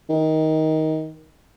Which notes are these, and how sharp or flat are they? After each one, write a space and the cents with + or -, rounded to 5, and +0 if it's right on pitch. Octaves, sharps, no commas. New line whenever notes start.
D#3 +15